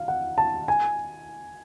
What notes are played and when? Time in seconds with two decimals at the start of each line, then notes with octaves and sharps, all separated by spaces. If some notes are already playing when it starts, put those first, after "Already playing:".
Already playing: F5
0.08 F#5
0.38 A5
0.68 G#5